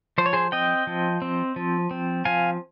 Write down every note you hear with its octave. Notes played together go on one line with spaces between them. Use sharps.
F3 C5
C#5
G#4 C5
C4 D#5 G5
F3
C4
F3
C4
F3 F5 G#5